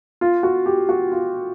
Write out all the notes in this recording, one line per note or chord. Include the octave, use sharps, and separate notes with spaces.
F4
F#4
G4
F#4
F4